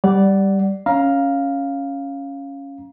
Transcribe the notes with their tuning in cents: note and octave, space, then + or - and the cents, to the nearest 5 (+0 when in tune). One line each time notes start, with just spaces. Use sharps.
G3 +0 D5 -10 F#5 +15
C#4 +0 F5 +0 A#5 +15